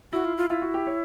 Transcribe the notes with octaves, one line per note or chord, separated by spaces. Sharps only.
E4 F#4
F4
F4
E4 F4
F#4
G4
C#5